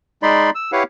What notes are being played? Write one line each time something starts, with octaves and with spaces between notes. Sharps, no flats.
G#3 D#4 D5 B5 C6
E6
E4 G4 B4 C#5 F5 F#5